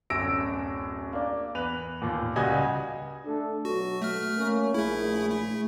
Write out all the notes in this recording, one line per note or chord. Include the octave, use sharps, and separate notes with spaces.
D1 F#2 E6 A#6 D7
A#3 D4
E2 B4 F7
D#2 A#2
C#2 G3 F#4 D#5 G#5 G#6
A3 D4 A4
B2 F#3 F#4 A4
A3 F6
A#3 C#4
A#1 A3 E4 G#4
A3